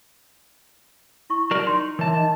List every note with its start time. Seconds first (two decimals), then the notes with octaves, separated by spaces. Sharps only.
1.30 E4 C#6
1.51 F#3 A#4 D5
1.67 D#4 C6
1.99 E3 A#4 C#5 E5 A5
2.16 D#4 D#5